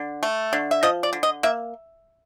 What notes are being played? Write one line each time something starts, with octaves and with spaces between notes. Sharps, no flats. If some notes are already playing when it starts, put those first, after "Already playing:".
Already playing: D3
A3
D3
E5
F3 D#5
D5
D3
D#5
A#3 E5